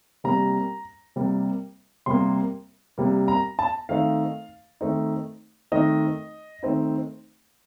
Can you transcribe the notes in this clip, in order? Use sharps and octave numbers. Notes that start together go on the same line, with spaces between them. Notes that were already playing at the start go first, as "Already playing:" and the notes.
C3 G3 A#3 A#5
C3 G3 A#3
C3 G3 A#3 C6
C3 G3 A#3
A#5
A5
D#3 A3 C4 D#4 F5
D#3 A3 C4 D#4
D#3 A3 C4 D#4 D#5
D#3 A3 C4 D#4